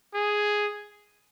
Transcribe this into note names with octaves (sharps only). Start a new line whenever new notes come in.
G#4